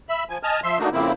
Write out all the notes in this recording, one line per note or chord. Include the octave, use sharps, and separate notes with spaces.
E5 B5
F3 G#5
D#5 G#5 A5 F6
F3 E5 C6
A3 A#3 D4 D#4 F#4
F2 C#3 A#3 C4 E4